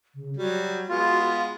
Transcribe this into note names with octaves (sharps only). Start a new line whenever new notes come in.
C#3
F#3 G3 F#4
G#3 B3 F4